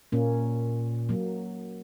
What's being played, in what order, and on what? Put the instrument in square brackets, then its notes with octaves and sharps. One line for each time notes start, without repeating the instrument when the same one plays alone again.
[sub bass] A#2 [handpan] A#3 C#4
[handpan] F#3 A#3